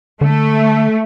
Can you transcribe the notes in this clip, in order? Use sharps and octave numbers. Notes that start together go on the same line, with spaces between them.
D3 A3